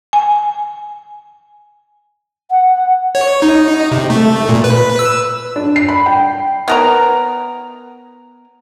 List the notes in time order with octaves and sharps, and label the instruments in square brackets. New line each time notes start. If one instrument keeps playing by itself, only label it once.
[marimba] G#5
[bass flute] F#5
[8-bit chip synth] C#5
D#4
C3
A3
A#2
B4
E6
[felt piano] D4
C7
B5
G5
[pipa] B3 A#4 A#5